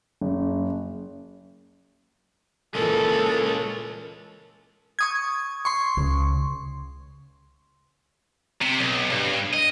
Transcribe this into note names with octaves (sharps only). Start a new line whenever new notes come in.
F#1
A#2 E3 G#3 C#4 A4 A#4
C#6 D#6 G#6
C6 C#6
C#2 C#3
C3
B1
G2
D#5